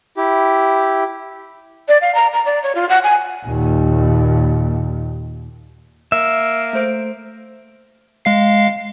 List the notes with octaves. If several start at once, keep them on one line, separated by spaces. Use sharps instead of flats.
E4 G4
D5
F5
A#5
A#5
D5
C#5
F4
F#5
G#5
D#2 A#2
A#3 E5
A3 C5 D7
G#3 F5 C7